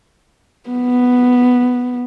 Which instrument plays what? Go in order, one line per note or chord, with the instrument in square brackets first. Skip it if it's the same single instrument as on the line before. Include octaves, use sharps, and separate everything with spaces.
[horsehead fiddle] B3